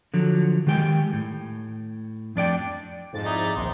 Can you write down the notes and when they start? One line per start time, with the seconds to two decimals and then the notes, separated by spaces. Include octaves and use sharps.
0.14 D3 F3 F#3
0.67 D#3 G#3 G4 G5 G#5
1.13 A2
2.36 F2 D4 D5 G5
3.13 F2 G#2 A6
3.25 D#4 E4 D5
3.56 A#1 D#2 G#3 D#4 C6